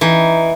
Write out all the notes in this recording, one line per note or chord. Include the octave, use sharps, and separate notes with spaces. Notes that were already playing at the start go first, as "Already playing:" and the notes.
E3 D#4